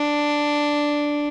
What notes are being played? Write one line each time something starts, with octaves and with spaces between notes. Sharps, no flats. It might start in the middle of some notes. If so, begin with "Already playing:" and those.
Already playing: D4